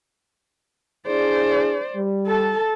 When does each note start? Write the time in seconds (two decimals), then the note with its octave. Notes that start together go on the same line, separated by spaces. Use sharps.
1.07 D4 E4 G#4 C5 D5
1.95 G3
2.27 A4 A5